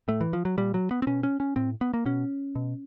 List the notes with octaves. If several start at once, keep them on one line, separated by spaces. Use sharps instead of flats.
A2 A3
E3
F3
F#3
A#2 G3
F#3
B3
C4
B2 C#4
C#4
C#4
A2 C4
B3
A#3
B2 C#4
B2